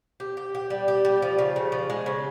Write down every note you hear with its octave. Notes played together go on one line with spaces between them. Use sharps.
G4
G4
G4
G3
G4
G3
F3
C#3
C#3
F3
G#3
C#3